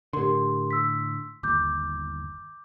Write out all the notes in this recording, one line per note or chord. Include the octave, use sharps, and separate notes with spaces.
A2 D3 G4 A#4 C6
C6 E6 B6
G1 D#2 D6 G6